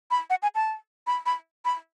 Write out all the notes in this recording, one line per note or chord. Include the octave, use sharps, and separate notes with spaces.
B5
F#5
G#5
A5
B5
B5
B5